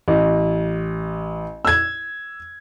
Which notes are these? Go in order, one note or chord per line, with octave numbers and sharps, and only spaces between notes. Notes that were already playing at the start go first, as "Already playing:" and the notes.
A1
E6 G#6